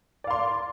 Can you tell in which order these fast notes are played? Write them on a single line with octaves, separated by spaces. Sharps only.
D5 F5 C6